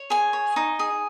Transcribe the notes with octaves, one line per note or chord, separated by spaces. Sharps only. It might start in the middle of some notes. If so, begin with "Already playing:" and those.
Already playing: C#5
G#4 G#5
C#5
D#4
G#4